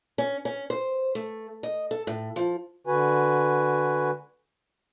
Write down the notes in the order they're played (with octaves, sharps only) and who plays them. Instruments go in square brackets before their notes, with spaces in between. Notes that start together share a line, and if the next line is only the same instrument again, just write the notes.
[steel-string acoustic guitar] C#4
C#4
C5
A3
D#5
A4
A2
F3
[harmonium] D3 F#4 B4 G#5